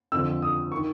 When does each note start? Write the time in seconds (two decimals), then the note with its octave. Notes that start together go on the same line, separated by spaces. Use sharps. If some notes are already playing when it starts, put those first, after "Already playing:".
0.12 F2 D3 F3 E6
0.42 D#6
0.72 C#6
0.75 D#3